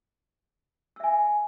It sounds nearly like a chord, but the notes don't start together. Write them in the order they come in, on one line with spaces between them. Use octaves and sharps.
E6 E5 G#5